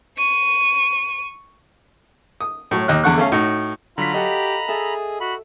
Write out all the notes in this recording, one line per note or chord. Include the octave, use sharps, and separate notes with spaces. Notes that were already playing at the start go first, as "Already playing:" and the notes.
C#6 D#7
D#6
A2 F#3
D#2 D#5 F#6
E2 D3 F#5 C#6 F#6
A3 C#4 F5
A2 D#4 F#4
D3 F#3 F4 A#5 B5 B6
G4 A4 D#5 F5 F#5
G#4 A4 E5
F#4 B5